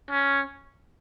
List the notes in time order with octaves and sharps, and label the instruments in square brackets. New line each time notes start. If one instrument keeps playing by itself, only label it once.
[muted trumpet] C#4